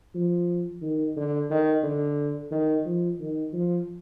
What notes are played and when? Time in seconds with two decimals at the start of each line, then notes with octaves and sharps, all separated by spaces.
0.15 F3
0.82 D#3
1.17 D3
1.51 D#3
1.83 D3
2.51 D#3
2.85 F3
3.20 D#3
3.53 F3